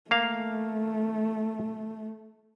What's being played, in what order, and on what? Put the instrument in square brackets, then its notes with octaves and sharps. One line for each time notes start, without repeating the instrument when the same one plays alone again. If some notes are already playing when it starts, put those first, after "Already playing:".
[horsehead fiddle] A3 [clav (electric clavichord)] A#3 F5